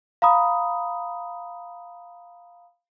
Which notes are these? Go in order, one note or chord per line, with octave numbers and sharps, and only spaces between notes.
F5 A#5 B5 D#6